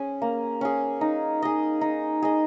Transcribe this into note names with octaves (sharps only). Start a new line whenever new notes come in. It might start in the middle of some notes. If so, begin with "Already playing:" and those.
Already playing: C#4 G#4
A#3
C#4 G#4
D#4
G#4 D#5
D#4
G#4 D#5